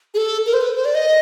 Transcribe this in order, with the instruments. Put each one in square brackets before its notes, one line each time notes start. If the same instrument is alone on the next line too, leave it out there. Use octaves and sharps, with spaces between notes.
[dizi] G#4
A4
A#4
C5
B4
C5
D5
D#5